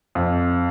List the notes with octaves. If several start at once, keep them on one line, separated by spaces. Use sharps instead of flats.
F2